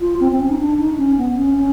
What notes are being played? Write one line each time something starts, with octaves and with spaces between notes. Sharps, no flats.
F4
C4
C4
C#4
D#4
D4
D#4
C#4
B3
C#4
C#4